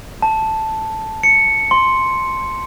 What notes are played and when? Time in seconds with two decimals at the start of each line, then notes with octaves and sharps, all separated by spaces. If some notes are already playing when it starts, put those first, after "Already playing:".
0.22 A5
1.23 C#7
1.71 C6